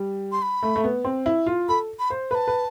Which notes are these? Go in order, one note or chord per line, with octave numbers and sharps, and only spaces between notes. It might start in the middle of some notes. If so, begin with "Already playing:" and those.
Already playing: G3
C6
B5
A3
A3
B3
C4
E4
F4
A4 B5
B5
C5
B4 A5 B5
B4